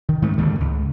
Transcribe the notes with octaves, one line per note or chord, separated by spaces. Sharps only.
D#3
G#2 D#3 G#3 A3
D#2 G#2 D3 D#3
C#2